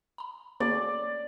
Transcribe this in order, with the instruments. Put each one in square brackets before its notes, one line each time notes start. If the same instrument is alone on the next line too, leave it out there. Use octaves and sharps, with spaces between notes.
[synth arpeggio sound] A#5 B5
[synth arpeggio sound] A#3 F#4 G#4 [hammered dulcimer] D5